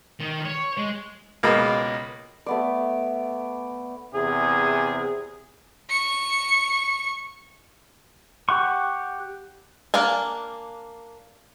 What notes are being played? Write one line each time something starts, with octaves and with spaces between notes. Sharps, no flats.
D#3
C#5
G#3
C#2 B2 G#3 A#3
A3 B3 D5
E2 C3 G#4
C#6 C#7
G4 F#5 C#6
A#3 D4 F5 G#5